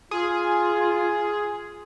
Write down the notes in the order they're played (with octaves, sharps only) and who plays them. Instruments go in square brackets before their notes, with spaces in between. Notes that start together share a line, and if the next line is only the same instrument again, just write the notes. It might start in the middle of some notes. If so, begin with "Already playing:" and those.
[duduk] F4 [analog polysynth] G#4